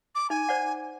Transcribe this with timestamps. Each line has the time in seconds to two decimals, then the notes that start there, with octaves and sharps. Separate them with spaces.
0.15 D6
0.30 D#4 G#5
0.49 C5 D5 F#5